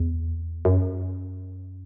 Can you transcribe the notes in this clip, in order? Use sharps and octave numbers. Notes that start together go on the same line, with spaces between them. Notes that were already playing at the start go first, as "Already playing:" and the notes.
Already playing: E2
F#2